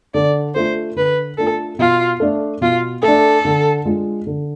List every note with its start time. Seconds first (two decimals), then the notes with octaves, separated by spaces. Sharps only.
0.14 D3 D5
0.55 A3 D4 F4 C5
0.96 D3 B4
1.37 A3 D4 F4 A4
1.79 B2 F4
2.20 A3 D4
2.61 B2 F4
3.03 A3 A4
3.08 D4
3.45 D3
3.85 G#3 D4 F4
4.27 D3